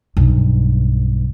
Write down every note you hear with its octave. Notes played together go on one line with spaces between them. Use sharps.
B1 G2